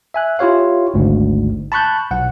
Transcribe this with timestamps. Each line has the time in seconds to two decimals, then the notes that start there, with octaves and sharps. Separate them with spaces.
0.14 E5 G#5 F#6
0.39 E4 F4 G4 C#5 F5
0.94 G#1 D2 G#2
1.72 A5 B5 C#6 F#6 G6
2.11 B1 F#5